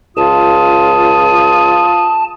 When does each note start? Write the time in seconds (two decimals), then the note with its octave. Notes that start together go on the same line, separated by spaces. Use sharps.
0.17 C#2 F4 A5 D#6